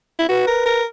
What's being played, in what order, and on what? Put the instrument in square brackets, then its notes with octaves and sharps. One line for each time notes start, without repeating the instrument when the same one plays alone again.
[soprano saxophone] E4
[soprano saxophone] F#4 [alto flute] B4
[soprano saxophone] A#4
A#4